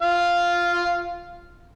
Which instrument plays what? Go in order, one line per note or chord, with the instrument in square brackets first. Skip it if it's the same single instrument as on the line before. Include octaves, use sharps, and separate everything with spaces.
[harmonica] F4 F5